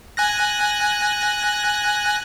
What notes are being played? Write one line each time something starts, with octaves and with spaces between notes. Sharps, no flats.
G#5 F#6 A#6